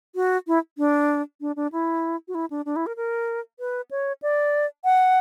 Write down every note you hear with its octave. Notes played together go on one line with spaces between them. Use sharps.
F#4
E4
D4
D4
D4
E4
F#4
E4
D4
D4
E4
A#4
A#4
B4
C#5
D5
F#5